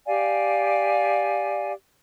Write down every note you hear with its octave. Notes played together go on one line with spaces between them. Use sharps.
G4 D5 F5 G#5